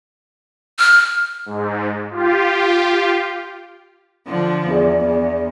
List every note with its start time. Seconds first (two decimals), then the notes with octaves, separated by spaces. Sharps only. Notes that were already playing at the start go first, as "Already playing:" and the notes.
0.79 F6
1.46 G#2
2.11 F4 G4
4.28 D3 F3
4.69 E2 D4 G#4 D5
5.05 E2